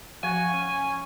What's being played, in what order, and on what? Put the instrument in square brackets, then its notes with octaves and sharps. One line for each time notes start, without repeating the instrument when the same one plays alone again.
[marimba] F3 [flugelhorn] F#4 [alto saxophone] G#5
[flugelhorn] C#4